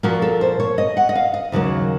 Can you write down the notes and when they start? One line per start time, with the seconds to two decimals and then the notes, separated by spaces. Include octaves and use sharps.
0.03 A#2 F3 A#3 F#4
0.22 A4
0.41 C5
0.60 C#5
0.78 D#5
0.97 F#5
1.09 D#5
1.15 F5
1.34 D#5
1.52 D#2 C#3 F#3 A#3